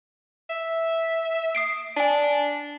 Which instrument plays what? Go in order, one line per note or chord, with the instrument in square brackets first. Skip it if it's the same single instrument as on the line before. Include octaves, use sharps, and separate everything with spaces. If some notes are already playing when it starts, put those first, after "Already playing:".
[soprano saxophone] E5
[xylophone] D#6 C7 D7
[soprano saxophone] D4 [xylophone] G#5 A5